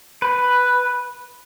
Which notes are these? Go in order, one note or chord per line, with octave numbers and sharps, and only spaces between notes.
B4